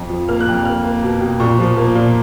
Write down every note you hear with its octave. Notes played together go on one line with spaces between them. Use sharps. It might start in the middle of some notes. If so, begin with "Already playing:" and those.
Already playing: F2
F3
A#3 F6
F#6
F2
F6
A#3 F6
A#3
B2
B2
A#2 C#6
F3
A#3
A#2